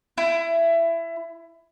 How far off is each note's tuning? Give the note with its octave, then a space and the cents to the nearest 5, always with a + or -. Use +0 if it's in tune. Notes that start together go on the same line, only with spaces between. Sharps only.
E4 +20